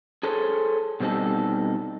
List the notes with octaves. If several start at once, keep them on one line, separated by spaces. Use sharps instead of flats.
G#4 A4 C5 C#5
B2 G3 C4 D#4 A4